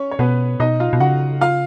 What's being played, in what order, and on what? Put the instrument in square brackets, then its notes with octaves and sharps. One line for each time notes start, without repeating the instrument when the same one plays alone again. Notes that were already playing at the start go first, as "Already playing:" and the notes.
Already playing: [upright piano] C#4 C#5
C#5
[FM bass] B2 [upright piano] B3 B4
[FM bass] B2 [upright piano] D#4 D#5
[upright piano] F4 F5
[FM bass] B2
[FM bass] C#3 [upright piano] F#4 F#5
[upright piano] F4 F5